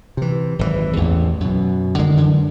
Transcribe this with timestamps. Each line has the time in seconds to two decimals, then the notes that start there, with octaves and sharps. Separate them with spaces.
0.17 C3 E3
0.59 G#1 F#2 A2 E3
0.96 A1 E2
1.40 F#2 B2
1.99 D3 D#3 G3 G#3
2.16 F#2 D3 E3